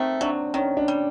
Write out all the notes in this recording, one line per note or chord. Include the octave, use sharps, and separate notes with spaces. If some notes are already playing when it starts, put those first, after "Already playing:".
Already playing: D#3 A3 C4
F#3 D4
D#3 C#4
D4
G3